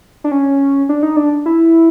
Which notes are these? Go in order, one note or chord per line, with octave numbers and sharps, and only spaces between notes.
D4
C#4
D4
D#4
D4
E4